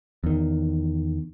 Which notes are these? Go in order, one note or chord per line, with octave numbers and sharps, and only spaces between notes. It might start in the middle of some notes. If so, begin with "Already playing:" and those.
E2 D#3